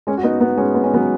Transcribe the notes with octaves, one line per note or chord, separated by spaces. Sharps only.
G#3 C#4
F#4
B3 D#4
B3 D#4
G#3 C#4
B3
C#4
F#3 B3